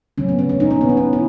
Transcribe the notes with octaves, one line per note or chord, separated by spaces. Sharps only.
C#3 F#3 A3 C#4
B3
C#4
C#4
D#4
C#4
B3
D#4
C#4
E4